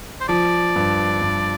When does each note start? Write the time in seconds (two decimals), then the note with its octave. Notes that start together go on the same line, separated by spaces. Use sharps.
0.21 C5
0.28 F3 D5
0.76 G2
1.22 G2